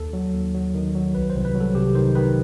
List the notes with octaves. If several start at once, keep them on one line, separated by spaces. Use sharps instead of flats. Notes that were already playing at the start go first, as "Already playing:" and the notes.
Already playing: D#2 A4
F#3
D#2
F#3
D#3
F#3
C2 B4
C5
C2
B4
F#3
A4
C3 G4
D#3 C5
D#3 B4